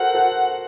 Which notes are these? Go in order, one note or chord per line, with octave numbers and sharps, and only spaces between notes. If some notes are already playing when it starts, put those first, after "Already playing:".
Already playing: F#4 A4 A#4 C5 F#5
A4 C5